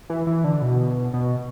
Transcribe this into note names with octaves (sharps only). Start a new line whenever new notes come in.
E3
E3
D3
B2
B2